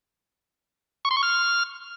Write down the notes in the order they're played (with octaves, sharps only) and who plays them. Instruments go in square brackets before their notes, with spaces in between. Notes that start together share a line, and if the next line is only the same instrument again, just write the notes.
[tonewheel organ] C#6
C6
C#6
F6